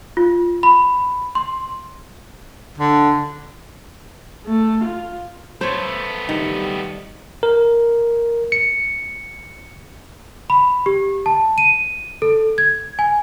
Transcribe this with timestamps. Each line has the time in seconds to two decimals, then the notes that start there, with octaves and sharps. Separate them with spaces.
0.17 F4
0.63 B5
1.35 C6
2.78 D3
4.47 A3
4.84 F4
5.61 A3 B3 C5 C#5
6.29 C3 D#3 F#3 G3
7.43 A#4
8.52 C#7
10.50 B5
10.86 G4
11.26 A5
11.58 D#7
12.22 A4
12.58 G#6
12.99 G#5